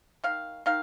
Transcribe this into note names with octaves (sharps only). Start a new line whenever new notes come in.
D#3 F5
D#3 F5